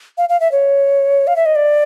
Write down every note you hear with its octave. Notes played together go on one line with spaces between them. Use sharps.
F5
F5
E5
C#5
F5
E5
D#5
D5